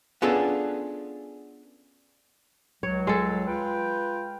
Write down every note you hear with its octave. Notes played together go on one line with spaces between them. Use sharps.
B3 C#4 D4 F4 G#4 A4
C#2 F#3 C#5
G#3 A4
F4 B4 G5